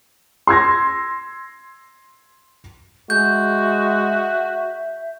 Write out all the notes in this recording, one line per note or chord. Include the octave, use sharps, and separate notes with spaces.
C6 E6 G#6 A#6
G#3 F#4 E5 G6